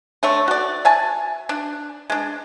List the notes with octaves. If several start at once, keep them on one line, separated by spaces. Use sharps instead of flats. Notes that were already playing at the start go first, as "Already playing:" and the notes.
D3 A3 C#5
F#4 D5
E5 G#5 A5
D4
G#3 D4